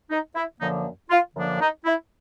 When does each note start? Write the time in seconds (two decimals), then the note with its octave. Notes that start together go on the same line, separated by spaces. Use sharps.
0.10 D#4
0.35 E4
0.60 F#2 D3 F3 A#3 D4 D#4
1.10 F4
1.35 F#2 D3 F3 A#3 D4
1.60 D#4
1.86 E4